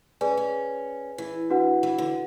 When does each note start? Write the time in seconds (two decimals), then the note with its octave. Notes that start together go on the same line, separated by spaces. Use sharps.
0.21 C#4 G#4 B4 D5 G#5
0.37 C#4
1.18 E3
1.50 D4 F#4 B4 F#5
1.83 E3
1.98 D3